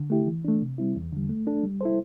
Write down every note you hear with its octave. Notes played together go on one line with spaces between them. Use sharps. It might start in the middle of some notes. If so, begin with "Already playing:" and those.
Already playing: D3
A3 E4 G4
E3
A3 D4
C3
G3 C4 E4
E2
D3 G3
A3
D4 A4
G3
E4 A4 C5